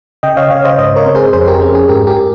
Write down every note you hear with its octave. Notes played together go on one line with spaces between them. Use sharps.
C#3 D#5 G5
C#5 F5
C#3 C#5 F5
C5 D#5
G#2 C5 D#5
A#4 C#5
C4
G#4 C5
F2 G#4 C5
G4 A#4
C#4 G#4
G#4
G#2 G4 A#4
G4 A#4